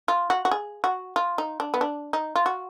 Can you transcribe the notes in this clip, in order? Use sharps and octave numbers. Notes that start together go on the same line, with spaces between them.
F4
F#4
F#4
G#4
F#4
F4
D#4
D4
B3
D4
D#4
F4
F#4